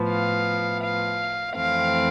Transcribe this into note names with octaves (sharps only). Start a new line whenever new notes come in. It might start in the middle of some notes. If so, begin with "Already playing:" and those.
Already playing: A2 F3 B3
F5
F5
F2 E3 A3 C4 F5